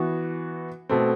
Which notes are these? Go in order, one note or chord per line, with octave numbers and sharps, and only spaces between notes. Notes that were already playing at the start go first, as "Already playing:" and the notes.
Already playing: E3 B3 F#4
B2 A3 C4